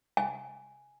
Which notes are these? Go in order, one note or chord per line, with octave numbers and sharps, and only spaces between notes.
G#5